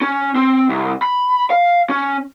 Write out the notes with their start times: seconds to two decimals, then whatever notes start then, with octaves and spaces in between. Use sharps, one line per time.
0.01 C#4
0.36 C4
0.69 C2
1.02 B5
1.50 F5
1.90 C#4